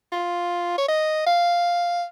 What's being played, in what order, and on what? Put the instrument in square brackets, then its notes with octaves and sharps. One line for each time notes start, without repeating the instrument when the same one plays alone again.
[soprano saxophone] F4
C#5
D#5
F5